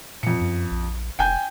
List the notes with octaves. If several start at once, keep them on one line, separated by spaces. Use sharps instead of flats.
F2 A#2 C#7
F#2
A#1
F1 G5 G#5 G6